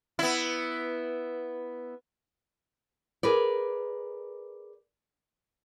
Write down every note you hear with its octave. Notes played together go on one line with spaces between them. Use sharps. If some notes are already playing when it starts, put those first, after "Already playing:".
B3 E4
G#4 A#4 B4 D5